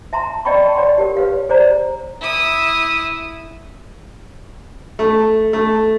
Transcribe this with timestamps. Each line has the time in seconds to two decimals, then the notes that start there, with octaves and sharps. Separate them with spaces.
0.13 E5 A5 A#5 C6
0.45 D5 D#5 G5 A5 B5 C#6
0.75 C#5 D5 F#5 A5 C6
0.98 G4 A#4
1.17 B4 C#5 F5
1.49 G#4 C5 D5 A#5
2.21 E4 D#6
4.99 A3
5.53 A3